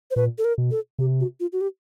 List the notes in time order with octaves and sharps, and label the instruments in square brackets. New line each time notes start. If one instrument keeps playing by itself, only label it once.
[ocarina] C5
[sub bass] A#2 [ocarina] B4
[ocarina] A4
A#4
[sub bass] B2
[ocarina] A4
[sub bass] C3 [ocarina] G4
[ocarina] F#4
F4
F#4
G4